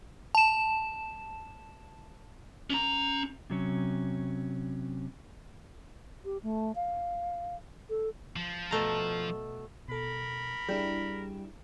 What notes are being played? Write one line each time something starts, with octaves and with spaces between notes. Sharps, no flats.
A5 E7
C#4 A#5
C3 F#3 C#4
G4
A3
F5
A4
F3
B2 A3 A#5
B2 A4 A#4 B5
G3 D4 E4 G#4